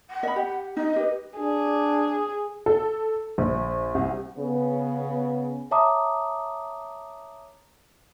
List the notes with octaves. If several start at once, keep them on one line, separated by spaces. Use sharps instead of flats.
F#5
D#5 B5
G4
D#4 D#5
G4 B4
D4 G#4
A4
A#1
C2
C#3 B3
C#5 E5 A5 A#5 D6 D#6